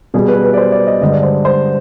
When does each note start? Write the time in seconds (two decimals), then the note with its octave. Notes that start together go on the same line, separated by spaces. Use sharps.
0.14 B2 G3 G#4
0.28 B4
0.43 B4
0.53 D5
0.58 C5
0.72 D5
0.87 D#5
1.01 G2 D3 G#3 D#5
1.12 D5
1.23 C5
1.45 C5